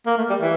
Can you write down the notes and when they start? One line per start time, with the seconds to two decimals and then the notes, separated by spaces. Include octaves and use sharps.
0.07 A#3
0.18 A3
0.30 G3
0.41 E3